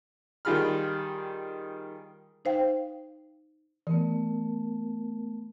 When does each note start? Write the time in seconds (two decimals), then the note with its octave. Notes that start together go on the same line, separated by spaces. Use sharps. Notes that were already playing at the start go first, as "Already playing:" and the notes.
0.45 D#3 G3 F4 G#4 B5 F6
2.45 D#4 C5 F5 G5
3.87 E3 A3 B3 A#4